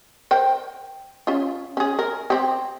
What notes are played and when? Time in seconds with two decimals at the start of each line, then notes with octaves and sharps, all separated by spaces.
0.31 A#4 C5 G5
1.27 C#4 F4
1.77 C#4 G#4
1.99 A#4
2.30 C4 G4